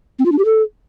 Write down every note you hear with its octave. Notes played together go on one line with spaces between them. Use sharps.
C4
F4
D4
G4
A4